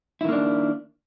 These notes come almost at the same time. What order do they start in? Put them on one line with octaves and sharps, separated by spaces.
E4 D#3 A#3 D4